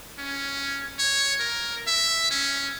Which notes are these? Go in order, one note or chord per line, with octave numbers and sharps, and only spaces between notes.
C#4
C#5
A#4
E5
C#4